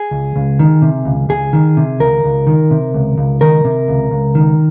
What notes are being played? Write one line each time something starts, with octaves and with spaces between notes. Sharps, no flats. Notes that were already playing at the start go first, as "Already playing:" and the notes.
Already playing: G#4
C#2
C#2
D#3
C3
C#2
C#2 G#4
D#3
C3
C#2 A#4
C#2
D#3
C3
C#2
C#2
D#3 A#4
C3
C#2
C#2
D#3